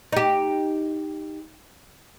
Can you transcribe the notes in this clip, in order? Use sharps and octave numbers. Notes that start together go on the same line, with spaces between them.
D#4 G4